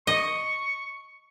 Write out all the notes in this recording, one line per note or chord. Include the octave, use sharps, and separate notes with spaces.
D#5 C#6